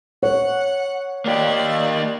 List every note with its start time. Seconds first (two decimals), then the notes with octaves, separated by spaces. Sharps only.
0.23 C#5 F#5
1.26 A#3 G4 D5